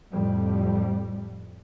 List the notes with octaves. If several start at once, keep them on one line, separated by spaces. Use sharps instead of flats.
F2 A2 G3